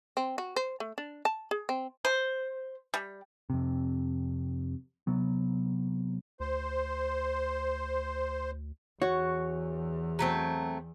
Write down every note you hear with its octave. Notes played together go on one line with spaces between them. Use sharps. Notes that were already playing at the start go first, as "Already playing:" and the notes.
C4
F#4
C5
A3
D4
A5
G#4
C4
C5
G3
F2 C3
C3 F#3 B3
D2 C5
E2 F#4 C#5
F#3 A3 C4